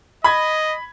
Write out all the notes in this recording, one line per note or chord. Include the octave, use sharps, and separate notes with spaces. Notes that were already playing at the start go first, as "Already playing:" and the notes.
D#5 B5 G#6